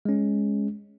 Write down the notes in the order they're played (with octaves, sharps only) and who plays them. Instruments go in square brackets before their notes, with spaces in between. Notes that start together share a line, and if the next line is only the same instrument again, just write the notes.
[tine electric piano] G#3 C#4